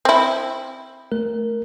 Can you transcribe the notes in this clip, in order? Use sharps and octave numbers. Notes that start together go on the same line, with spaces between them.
C4 E4
A3 A#4